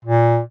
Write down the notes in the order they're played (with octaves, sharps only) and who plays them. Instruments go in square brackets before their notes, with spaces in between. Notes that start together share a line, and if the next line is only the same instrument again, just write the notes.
[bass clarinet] A#2